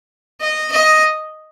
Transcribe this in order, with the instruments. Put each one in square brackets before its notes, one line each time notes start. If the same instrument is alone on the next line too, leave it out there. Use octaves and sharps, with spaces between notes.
[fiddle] D#5
D#5